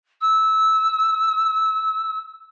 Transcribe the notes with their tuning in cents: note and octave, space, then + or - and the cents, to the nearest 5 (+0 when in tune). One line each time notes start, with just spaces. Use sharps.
E6 -15